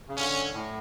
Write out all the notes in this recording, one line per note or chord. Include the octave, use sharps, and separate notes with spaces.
C#3
D3 C#4
A2